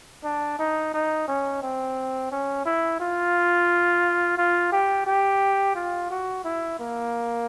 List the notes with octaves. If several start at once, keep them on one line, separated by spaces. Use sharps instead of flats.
D4
D#4
D#4
C#4
C4
C#4
E4
F4
F4
G4
G4
F4
F#4
E4
A#3